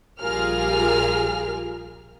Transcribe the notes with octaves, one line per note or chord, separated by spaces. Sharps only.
A#1 G3 F4 G#4 A#4 F6